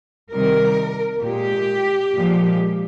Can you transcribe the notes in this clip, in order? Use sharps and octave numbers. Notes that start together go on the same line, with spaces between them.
C3 D#3 G3 A#4
A#2 G#3 G4
A#2 F3 G#3